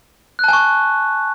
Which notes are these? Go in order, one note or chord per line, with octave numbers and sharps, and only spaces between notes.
G#5 A5 C#6 F#6